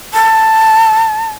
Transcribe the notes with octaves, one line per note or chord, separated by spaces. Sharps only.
A5